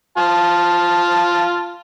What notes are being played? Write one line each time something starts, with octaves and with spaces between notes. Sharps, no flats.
F4 A5